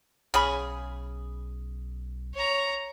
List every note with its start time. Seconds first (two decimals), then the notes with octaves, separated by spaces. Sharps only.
0.34 B1 C#3 G#4 B5
2.34 C#5 A#5